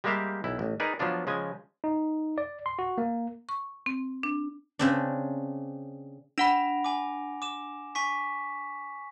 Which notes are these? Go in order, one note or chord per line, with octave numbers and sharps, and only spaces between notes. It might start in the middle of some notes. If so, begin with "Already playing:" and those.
G3 G#3 A#3 G4 E5 F5
B1 E4
A1
D#4 G#4 A#4 B4 D5
F3 F#3 B3 D4 F4
C#3 F3 G#3 G#5
D#4
D5
C6
F#4
A#3
C#6
C4
D4
C#3 C4 D4
D4 F#5 B5 A#6 D7 F7
G#5 D6
D6 E7
G#5 C#6 B6